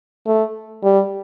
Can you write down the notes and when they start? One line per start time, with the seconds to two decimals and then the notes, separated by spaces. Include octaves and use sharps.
0.27 A3
0.83 G3